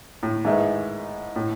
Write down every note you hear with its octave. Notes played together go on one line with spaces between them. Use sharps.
A2
G#2 D#3 A3 E4 G#4 B4
A2